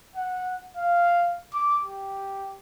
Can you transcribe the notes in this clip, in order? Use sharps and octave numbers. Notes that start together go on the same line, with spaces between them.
F#5
F5
D6
G4